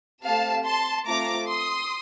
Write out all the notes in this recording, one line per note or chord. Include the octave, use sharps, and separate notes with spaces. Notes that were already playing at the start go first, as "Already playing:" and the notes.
A3 C4 G4 F5 A5
A5 C6
A3 C4 F4 A#5 D6
C6 D#6